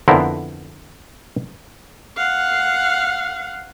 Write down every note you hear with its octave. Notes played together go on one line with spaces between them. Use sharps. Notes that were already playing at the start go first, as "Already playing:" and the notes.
F2 D3 B3 E4 A#4 C5
F5 F#5